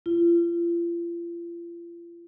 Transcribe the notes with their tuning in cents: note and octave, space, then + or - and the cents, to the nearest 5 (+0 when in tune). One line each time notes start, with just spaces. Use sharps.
F4 -40